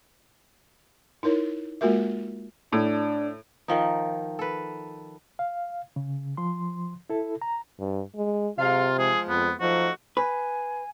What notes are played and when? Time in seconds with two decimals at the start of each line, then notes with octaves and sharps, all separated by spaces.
1.23 D#4 E4 A#4 C#5
1.81 G#3 A#3 F4 F#4 A#4 E5
2.73 A2 D4
3.68 D#3 F3 D#4
4.39 A4 B4
5.39 F5
5.96 C#3
6.37 F3 C6
7.10 E4 A4
7.42 A#5
7.80 G2
8.16 G#3
8.59 C3 F#3 G#3 F4 F5
8.99 F3 G#3 G#4
9.29 F2 B3
9.60 F3 F#3 A3 D#4 F#4
10.17 B4 G#5